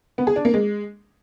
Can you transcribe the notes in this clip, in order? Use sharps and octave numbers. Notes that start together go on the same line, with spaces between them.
B3
G#4
D4
A#3
G#3